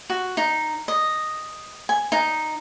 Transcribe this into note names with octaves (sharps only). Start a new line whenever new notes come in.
F#4
D#4
D#5
G#5
D#4